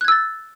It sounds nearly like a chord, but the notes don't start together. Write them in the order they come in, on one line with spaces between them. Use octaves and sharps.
F#6 G#6 E6 A6